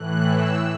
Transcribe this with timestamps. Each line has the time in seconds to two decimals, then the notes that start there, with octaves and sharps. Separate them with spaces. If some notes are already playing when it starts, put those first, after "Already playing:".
Already playing: A2 E3 F#6
0.25 E6